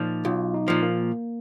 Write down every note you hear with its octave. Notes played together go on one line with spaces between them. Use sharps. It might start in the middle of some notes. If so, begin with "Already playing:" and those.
Already playing: A#2 F3 D#4
B1 F4
D#4
A#2 F3
A#3